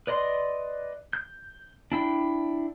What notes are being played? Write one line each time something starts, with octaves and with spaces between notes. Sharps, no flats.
B4 D5 D#5 C6
G6
D4 E4 G5